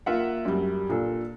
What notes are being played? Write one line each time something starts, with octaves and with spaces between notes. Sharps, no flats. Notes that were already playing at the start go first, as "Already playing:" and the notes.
A#3 F4 E5 F#5
F#2 G3
A#2 D4 A4